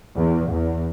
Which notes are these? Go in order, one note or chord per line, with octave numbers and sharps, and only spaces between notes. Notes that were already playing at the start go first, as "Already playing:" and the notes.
E2
E2